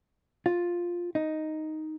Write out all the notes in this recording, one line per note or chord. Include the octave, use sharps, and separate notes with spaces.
F4
D#4